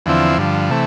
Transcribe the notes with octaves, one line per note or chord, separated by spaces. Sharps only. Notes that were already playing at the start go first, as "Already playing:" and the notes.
E2 D3 F3 C4 E4
G2 D3 F3
C3 E3 A3